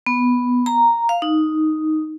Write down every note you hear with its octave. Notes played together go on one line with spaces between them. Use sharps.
B3
A#5
F5
D#4